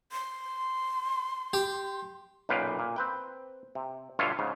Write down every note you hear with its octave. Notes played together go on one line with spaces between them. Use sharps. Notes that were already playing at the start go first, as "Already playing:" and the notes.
C6
G4
B1 F#2 A#2 B4 F5 G5
A#2
C4 B4 G5
C3
G2 B2 D3 F4 C#5 E5
G#2 C#3